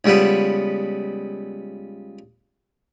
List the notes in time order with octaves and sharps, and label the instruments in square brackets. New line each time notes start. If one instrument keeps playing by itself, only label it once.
[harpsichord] C#2 G3 B3